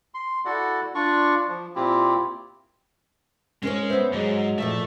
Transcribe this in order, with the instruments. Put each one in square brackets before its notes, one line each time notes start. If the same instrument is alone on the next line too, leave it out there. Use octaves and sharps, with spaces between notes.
[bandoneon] C6
E4 F#4 A4 D5 F#5
D4 F4 D5 C#6
F3
A#2 C4 E4 F4 G4
[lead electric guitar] G#3 [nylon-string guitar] C#4 A#4 C#5
[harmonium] B3 E5 [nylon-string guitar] C5 C#5
[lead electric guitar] G#2 [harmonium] F#3 G#3
[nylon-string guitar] A#2 F3 E5 [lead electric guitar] A3